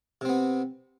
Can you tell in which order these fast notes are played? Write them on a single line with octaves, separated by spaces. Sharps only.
C3 C4 B3